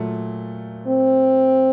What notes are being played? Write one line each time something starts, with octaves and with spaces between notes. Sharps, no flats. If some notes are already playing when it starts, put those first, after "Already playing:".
Already playing: A#2 F#3 A3
C4